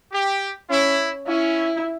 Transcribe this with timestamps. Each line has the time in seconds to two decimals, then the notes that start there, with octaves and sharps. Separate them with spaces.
0.12 G4
0.70 C#4 E4
1.28 C#4 E4